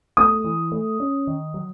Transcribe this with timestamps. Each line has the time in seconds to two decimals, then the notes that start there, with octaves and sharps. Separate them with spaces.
0.17 A3 D#6
0.44 E3
0.72 A3
1.00 C#4
1.27 D#3
1.54 F#3